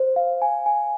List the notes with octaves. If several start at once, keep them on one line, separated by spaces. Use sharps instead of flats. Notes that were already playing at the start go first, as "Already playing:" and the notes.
Already playing: C5
F5
G#5
G#5